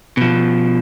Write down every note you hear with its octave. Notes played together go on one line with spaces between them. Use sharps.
B2 F3